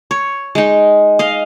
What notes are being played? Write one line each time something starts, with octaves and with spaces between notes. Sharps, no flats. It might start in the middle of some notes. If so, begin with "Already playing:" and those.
C#5
G#3 D#4
D#5 F5